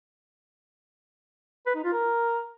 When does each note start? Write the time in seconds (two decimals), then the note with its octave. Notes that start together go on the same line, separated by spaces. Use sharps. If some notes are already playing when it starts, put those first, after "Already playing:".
1.66 B4
1.75 D#4
1.84 F4
1.93 A#4